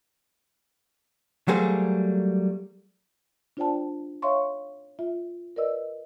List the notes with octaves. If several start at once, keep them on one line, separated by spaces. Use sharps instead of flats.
F#3 G3 A3 A#3 G#4 C5
D4 F4 C5 D5 G5 A5
C#5 E5 F5 C6 C#6
F4 E5
A#4 B4 D5 D#5 E6